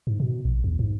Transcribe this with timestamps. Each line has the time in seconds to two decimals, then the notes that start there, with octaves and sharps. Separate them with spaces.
0.07 G#2
0.20 B2
0.45 A#1
0.64 E2
0.79 G#2